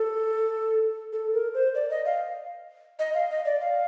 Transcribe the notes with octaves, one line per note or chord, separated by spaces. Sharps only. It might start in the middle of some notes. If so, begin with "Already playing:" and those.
Already playing: A4
A4
A#4
C5
D5
D#5
F5
D#5
F5
D#5
D5
F5